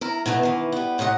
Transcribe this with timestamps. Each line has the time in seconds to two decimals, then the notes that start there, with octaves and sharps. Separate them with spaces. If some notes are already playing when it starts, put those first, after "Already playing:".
0.01 E4 A#4
0.26 B2 E3 A3 B3
0.43 D#3 E3
0.72 G3 B3
0.98 F#2 A2 C3 D#5 F#5